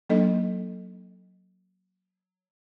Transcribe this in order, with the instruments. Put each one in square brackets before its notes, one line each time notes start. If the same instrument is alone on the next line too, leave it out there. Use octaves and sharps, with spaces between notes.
[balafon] F#3 A#3 D4 D#4 A4 D#5